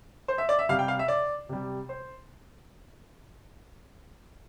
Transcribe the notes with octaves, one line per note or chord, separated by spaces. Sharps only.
C5
E5
D5
E5
C3 G3 F5
G5
F5
E5
D5
C3 G3
C5